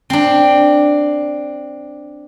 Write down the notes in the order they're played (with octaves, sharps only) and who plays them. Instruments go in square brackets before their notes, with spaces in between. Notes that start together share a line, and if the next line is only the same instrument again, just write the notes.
[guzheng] C4 D4